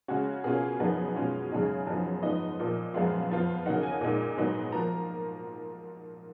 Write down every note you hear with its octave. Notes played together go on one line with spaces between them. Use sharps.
C#3 G#3 C#4 F#4
B2 A#3 C#4 F4 G#4
F#2 F3 B3 D#4
B2 G#3 C#4 F4
F#2 C#3 G#3 D#4 G#4
F#2 F3 B3 D#4
G#2 F3 B3 D#4 D#5
A#2 F3 A#3 F4
F#2 F3 G#3 B3 F4 F5
F2 F3 B3 F4
C#3 F#3 A#3 D#4 F#5
G#5
A#2 G#3 D#4
G#2 F#3 B3 D#4
F3 A#3 A#5